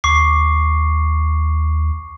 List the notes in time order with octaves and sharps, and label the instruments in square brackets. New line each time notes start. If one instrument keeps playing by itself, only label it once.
[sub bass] D#2 [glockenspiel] C#6 D6 C7